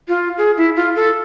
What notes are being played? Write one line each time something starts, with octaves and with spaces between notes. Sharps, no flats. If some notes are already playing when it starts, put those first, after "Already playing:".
F4
G#4
E4
F4
A4